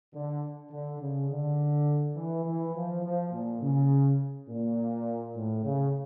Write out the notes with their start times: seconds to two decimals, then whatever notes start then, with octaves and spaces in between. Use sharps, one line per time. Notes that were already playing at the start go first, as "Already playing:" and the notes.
0.14 D3
0.71 D3
1.00 C#3
1.29 D3
2.16 E3
2.44 E3
2.74 F3
3.03 F3
3.31 A#2
3.61 C#3
4.48 A#2
5.34 A2
5.63 C#3